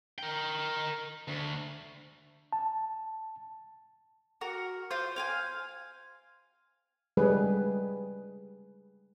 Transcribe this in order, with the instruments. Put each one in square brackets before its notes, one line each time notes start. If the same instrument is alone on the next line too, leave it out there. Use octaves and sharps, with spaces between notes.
[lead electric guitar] A#4 G5
D2
[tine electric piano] A5
[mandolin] F#4 A#4
F4 C5
F5 G5 G#5
[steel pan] G3 G#3 G#4 B4